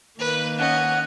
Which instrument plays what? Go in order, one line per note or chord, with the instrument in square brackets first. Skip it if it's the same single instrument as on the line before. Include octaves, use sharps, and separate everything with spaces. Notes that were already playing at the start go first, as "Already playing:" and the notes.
[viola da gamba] D#3 A#3 [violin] B4
[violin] C#4 D#5 [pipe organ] F#5